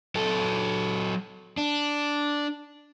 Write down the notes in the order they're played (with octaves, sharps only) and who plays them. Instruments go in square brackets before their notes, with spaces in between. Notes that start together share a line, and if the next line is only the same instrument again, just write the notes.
[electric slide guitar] F#3 F#4 A4
D4